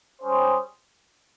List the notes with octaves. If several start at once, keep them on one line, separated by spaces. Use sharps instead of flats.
G3 C#4 G#4 C5